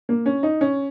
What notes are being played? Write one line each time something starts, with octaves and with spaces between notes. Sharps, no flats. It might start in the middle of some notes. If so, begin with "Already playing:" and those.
A#3
C#4
D#4
C#4